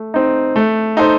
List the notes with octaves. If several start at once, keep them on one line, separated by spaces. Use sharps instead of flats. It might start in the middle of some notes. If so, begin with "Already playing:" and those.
Already playing: A3
C4 D#4
A3
D#4 A4 C5